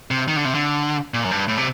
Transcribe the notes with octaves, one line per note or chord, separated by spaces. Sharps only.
C3
D#3
D3
C3
D3
A#2
F#2
G2
A2
C3